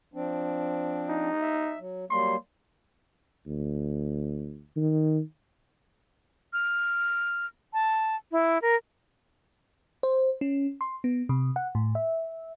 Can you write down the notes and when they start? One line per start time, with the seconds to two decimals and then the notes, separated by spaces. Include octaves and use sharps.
0.14 F3 C4 D4
1.09 D#4
1.41 E5
1.79 F#3
2.10 F#3 G3 A#3 C6
3.47 D2
4.76 D#3
6.53 F6
7.73 A5
8.32 E4
8.62 A#4
10.03 C5
10.41 C#4
10.81 C6
11.04 B3
11.29 C3
11.56 F#5
11.75 A2
11.95 E5